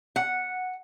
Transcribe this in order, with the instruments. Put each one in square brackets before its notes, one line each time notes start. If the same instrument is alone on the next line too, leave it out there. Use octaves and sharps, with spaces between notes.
[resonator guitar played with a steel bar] F#5